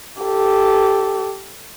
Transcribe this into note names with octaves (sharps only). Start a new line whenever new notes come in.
G4 A4